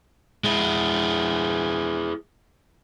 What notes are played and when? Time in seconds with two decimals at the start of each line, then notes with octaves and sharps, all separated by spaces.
0.44 G#3 E4